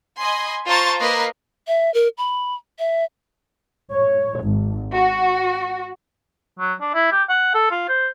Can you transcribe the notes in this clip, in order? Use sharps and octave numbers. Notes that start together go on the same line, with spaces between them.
D#5 G#5 B5 C6
F4 C5 A5 A#5 C#6 A6
A#3 A#4 B4 D#5 A#6 C7
E5
A#4
B5
E5
C#5
G#1
F#4
F#3
D4
E4
G4
F#5
A4
F4
C5